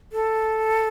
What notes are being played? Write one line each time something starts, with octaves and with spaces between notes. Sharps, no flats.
A4